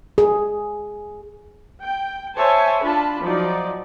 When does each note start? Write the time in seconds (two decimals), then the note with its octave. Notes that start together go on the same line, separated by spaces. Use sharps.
0.18 G#4
1.82 G5
2.36 C5 C#5 E5 G#5 A5
2.83 D4 F4 A5 B5
3.22 F3 F#3 D#4 D5